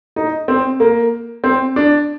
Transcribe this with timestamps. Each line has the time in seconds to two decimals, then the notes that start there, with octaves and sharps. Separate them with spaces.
0.16 D#4
0.48 C4
0.80 A#3
1.44 C4
1.76 D4